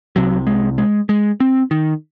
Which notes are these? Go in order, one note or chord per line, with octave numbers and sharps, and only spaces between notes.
C2 C3 F#3
G#3
G#3
G#3
C4
D#3